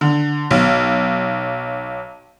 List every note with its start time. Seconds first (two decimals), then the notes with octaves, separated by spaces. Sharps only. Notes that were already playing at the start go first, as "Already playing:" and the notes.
0.01 D3
0.51 B1